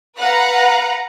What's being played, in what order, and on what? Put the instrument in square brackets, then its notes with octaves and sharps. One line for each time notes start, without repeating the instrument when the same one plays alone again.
[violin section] B4 F5 F#5 A#5